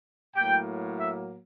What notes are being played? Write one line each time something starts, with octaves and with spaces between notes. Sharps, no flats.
A2 F#3 A#3 G5
E5